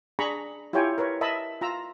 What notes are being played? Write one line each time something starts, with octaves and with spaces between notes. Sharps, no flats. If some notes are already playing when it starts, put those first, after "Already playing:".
D4 G#4 A#5 B5 C#6
E4 F4 G4 C#5 G5 G#5
A#4 B4 C#5
A#4 D#5 E5 A5 B5
F4 A#5 E6